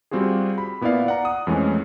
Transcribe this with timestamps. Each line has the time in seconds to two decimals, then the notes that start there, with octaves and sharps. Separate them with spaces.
0.11 G3 C4 F4 F#4 G#4
0.58 B5
0.81 A#2 B3 E4 D5 F5
1.06 D5 F#5 A#5
1.25 D#6
1.47 F2 E3 G#3 A3 C#4